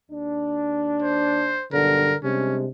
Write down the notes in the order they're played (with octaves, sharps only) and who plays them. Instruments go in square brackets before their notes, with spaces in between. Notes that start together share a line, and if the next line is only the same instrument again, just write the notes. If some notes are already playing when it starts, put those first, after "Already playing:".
[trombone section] D#2 D4
[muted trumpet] C5
[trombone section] B1 G2 [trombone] D3 [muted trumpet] A#4
[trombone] C3 [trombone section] G3 G#3 D4 [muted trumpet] C#4